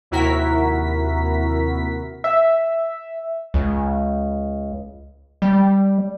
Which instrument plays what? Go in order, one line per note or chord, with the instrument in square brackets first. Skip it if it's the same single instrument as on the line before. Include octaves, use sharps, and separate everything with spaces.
[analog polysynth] D#2 C3 E4 F#4 A#4 B6
[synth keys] E5
[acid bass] C#2
G3